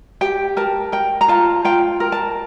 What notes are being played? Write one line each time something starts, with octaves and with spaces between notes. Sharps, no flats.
G4 G5
A#4 A5
A#4 G5
A#5
F4 A5
F4 G5
A#4
A5